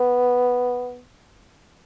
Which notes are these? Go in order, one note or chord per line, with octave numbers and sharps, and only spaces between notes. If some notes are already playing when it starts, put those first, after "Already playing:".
Already playing: B3